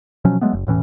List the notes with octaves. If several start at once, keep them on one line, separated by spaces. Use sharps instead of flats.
B2 F3 F#3 C#4
F#3 G#3 A3 B3
F#1
E1 A2 E3 C#4